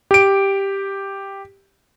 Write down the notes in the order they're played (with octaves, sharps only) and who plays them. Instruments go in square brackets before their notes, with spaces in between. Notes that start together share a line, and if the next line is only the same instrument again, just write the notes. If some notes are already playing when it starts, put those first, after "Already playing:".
[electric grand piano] G4 D7